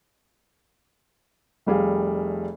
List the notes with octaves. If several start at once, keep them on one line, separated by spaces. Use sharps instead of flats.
F1 G3 G#4 F5